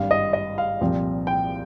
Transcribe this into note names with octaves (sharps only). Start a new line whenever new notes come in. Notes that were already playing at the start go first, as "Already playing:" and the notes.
Already playing: G#1 G2 G3 F5
D#5
D#5
F5
C2 A#2 F3 C4
G5